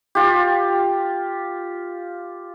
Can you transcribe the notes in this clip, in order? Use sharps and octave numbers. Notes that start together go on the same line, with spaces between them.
F4 G4